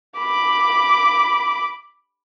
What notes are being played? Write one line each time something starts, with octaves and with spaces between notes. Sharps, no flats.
B5 D6